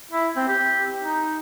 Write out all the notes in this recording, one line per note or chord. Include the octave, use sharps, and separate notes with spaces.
E4
C4
G4
D#4